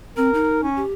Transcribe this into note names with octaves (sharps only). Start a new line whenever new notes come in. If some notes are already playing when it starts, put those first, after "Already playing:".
C4 A#4
D#4
C#4
G4